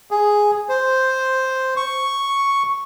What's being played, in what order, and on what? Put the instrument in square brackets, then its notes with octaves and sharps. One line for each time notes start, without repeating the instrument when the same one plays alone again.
[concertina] G#4
C5
C#6